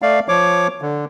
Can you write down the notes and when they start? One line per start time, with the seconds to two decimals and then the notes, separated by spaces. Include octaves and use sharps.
0.02 A3 D5 F5
0.28 F3 C#5 D6
0.82 D3